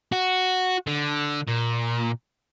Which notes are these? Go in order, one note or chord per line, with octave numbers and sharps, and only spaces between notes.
F#4
D3
A#2